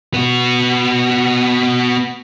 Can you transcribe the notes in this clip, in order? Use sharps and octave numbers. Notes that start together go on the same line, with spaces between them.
B3 F#4